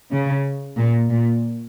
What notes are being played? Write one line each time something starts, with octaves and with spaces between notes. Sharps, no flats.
C#3
A#2
A#2